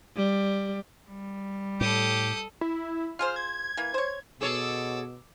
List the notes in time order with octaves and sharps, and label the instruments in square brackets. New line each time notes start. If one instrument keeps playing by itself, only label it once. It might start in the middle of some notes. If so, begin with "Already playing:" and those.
[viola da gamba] G3
[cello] G3
[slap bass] A2 [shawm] G4 [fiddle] A4 D#6
[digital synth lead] E4
[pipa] F4 G#4 C5 [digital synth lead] F6
[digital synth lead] G#6
[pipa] E3 A#3
C5 C#5
[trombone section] B2 [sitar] G#4 A4 C#5 [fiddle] D6 E6